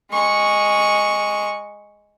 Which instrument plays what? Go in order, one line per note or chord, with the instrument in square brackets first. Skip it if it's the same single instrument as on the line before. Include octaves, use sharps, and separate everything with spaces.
[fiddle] G#3 C#6